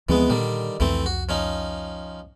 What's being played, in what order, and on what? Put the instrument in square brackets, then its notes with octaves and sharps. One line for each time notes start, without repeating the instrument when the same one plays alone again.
[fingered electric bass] D2 F3 C4 [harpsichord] E3 G#3 B3
[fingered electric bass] A#2 [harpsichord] D3 D#3 G3
[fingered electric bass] C2 F2 [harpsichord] E3 A3 C4
[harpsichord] F#4
F3 C#4 D#4